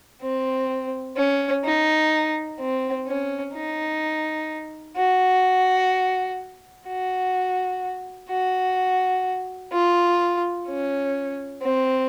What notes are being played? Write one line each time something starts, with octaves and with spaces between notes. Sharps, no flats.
C4
C#4
D#4
C4
C#4
D#4
F#4
F#4
F#4
F4
C#4
C4